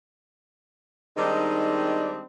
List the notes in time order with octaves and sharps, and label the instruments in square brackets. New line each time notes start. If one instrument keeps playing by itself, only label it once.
[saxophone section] D#3 G3 G#3 C4 D4 D#4